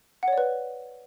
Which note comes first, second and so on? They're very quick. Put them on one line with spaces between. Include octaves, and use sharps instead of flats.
F#5 C#5 D5 B4